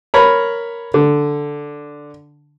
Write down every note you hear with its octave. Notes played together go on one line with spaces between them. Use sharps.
A#4 C#5 A#5 B5
D3